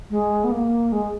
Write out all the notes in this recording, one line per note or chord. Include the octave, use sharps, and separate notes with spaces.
G#3
B3
A#3
G#3